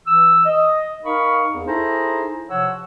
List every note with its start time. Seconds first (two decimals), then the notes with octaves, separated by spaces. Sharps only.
0.06 E3 E6
0.46 D#5
1.04 D#4 A#4 D#5 F5 B5 C#6
1.52 E2
1.67 D#4 E4 G#4 A4 C5 A#5
2.50 C3 F3 C#5 F#5 E6